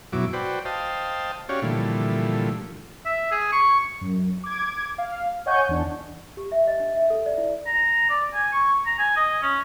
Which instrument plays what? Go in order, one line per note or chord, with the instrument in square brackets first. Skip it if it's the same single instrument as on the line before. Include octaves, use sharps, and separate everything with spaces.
[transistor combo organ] F#2 B2 F#3 E4 D6
F#4 B4 C5 D5 G5
C5 D#5 F5 G5 A5
C#4 F#4 G4 C#5 D5 F5
A#2 D3 E3 F3 G3 A3
[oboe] E5
G#4
C#6
[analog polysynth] F#2
D6 G#6
F5
C#5 D#5 F#5 G#5 C#6 G6
E2 D4
[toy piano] G4
E5
D#5
D4
E5
A4
D5
E4
[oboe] A#5
D5
G#5
C#6
A#5
G#5
D#5
C#4